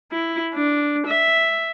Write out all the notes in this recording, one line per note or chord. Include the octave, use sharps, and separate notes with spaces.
E4
D4
E5